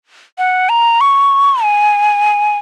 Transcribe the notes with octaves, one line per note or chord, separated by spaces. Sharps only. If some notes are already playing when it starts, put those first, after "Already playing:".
F#5
A#5
C#6
G#5